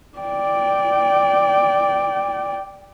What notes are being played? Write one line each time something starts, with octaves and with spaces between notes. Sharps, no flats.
D5 G5